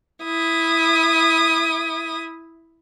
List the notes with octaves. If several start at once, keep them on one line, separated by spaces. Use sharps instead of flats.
E4 D#6